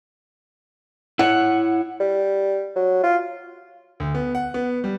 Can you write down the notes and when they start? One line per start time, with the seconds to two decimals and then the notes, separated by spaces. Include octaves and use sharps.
1.19 E4 C#5 F#5
2.00 G3
2.76 F#3
3.04 F4
4.00 D2
4.15 B3
4.35 F#5
4.54 B3
4.84 G3